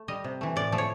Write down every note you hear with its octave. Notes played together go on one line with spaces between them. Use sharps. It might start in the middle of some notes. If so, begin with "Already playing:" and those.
Already playing: A3
G3 D#5
C3
E3 A3
A2 D5
F3 A3
C#5